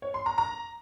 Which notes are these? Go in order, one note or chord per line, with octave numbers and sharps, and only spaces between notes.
C#5
C6
A#5
A#5